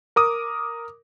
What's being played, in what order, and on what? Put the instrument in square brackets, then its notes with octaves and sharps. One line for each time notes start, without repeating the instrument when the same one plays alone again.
[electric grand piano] A#4 D6 D#6